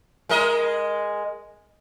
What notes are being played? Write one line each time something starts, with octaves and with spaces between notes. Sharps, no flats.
G#3 A#4 D#5